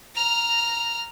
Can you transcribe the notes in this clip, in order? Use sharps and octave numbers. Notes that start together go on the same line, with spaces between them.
A#5 F6